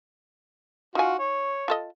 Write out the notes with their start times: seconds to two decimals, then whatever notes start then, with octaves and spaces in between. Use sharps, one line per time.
0.95 D#4 F4 F#4 G#5
1.19 C#5
1.68 F4 A4 D#5